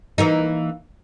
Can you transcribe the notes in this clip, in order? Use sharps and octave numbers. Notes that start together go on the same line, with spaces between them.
E3 A#3 D#4